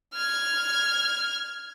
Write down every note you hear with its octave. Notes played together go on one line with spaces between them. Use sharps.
F6 G#6